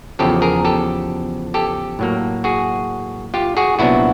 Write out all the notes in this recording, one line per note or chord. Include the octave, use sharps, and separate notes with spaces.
E2 C#3 F3 G4 A4
G#4 A#4
G4 A4
G4 A4
A2 F#3 A#3
F#4 G#4
F4 G4
F#4 G#4
C2 A#2 F#3 B3 D4 E4 F#4